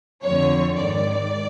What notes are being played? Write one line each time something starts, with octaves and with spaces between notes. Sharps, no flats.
F2 D3 C#5
G#2 D#3 D5